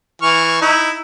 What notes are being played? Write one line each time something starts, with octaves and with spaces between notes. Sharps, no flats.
E3 C#6 F6
D#4 E4